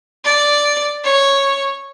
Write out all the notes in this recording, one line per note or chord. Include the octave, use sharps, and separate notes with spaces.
D5
C#5